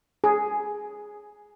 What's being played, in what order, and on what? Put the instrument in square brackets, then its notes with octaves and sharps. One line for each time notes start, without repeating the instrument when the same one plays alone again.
[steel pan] G#4